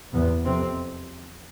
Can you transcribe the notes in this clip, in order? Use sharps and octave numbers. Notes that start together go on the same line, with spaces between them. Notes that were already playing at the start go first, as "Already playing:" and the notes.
E2 C3 B3
F2 C3 C4